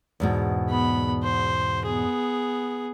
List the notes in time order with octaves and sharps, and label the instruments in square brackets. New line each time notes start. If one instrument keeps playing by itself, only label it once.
[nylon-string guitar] E2 G#2 B2
[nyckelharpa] B3 B5
C5
B3 G#4